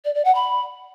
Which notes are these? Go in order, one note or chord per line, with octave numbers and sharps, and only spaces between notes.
D5
D5
F#5
B5